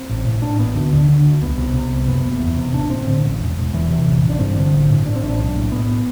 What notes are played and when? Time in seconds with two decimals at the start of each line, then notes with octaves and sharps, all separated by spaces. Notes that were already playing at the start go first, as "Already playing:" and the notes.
Already playing: C4
0.09 A1
0.26 A2
0.42 A2 D4
0.59 A1 B3
0.75 D2
0.93 D3
1.09 D3
1.25 D2
1.42 C2 B3
1.58 C3
1.75 C3
1.91 C2
2.08 F#1 B3
2.25 F#1
2.41 E2
2.57 C3
2.74 A1 D4
2.90 A2 C4
3.07 A2 D3
3.24 A1
3.41 E1
3.57 E1
3.74 E2 E3
3.90 C3
4.07 A1
4.22 A1
4.30 D4
4.39 G2 C4
4.56 D3
4.73 A1
4.90 A2
5.05 A2 D4
5.16 C4
5.22 A1 D4
5.38 B1
5.55 A2
5.72 A2 B3